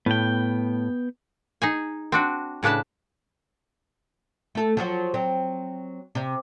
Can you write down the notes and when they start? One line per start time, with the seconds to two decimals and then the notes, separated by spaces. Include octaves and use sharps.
0.06 A2 B3 G5
1.62 D#4 G#4 G#5
2.12 C4 D4 F#4
2.63 A2 C#3 D4 B4 A5
4.55 A3 A4
4.77 F3 F#3 F#4
5.14 F#3 C4
6.15 C3